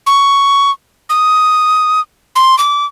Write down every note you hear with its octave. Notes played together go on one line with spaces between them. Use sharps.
C#6
D#6
C6
D6